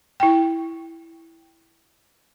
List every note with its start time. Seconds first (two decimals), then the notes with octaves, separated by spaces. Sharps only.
0.20 E4 G5